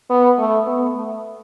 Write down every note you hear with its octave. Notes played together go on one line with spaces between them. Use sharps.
B3
A3
B3
A3